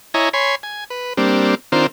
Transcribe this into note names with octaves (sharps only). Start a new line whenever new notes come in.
E4 C#5 D#5 G#5 A#5
C#5 G#5 B5 C6
G#5
B4
G3 A#3 C4 D4
D#3 C4 D4 F4 A#4 C5